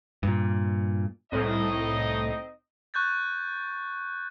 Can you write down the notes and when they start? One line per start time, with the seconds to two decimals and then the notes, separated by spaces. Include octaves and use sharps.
0.23 G2 A#2
1.32 C2 A2 C4 D#4 D#5
2.94 C#6 F#6 G6 A6